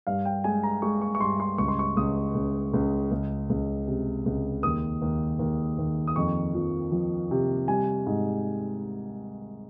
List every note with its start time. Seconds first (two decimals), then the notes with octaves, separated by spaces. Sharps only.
0.07 G2 F5
0.25 G5
0.44 G#3 G#5
0.63 A#5
0.82 G#3 C#6
1.02 C#6
1.15 C#6
1.21 G2 C6
1.40 C6
1.58 C#2 C#6
1.68 C6
1.79 C#6
1.96 C#2 D#6
2.35 C#2
2.73 C#2
3.11 C#2
3.50 C#2
3.88 C3
4.26 C#2
4.63 D#2 D#6
5.02 D#2
5.39 D#2
5.78 D#2
6.07 D#6
6.16 F2 C#6
6.55 F3
6.92 F3
7.31 C3
7.68 G3 G#5
8.06 G#2